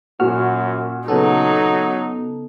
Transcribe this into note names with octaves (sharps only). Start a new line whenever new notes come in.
F#2 A#2 F#4 F6
C#3 F#3 B3 D#4 A4